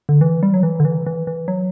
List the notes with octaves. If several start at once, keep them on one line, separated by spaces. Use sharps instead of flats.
D3
E3
G3
F#3
E3
D3
E3
E3
E3
F#3